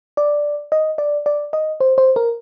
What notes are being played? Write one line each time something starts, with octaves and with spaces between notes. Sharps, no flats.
D5
D#5
D5
D5
D#5
C5
C5
A#4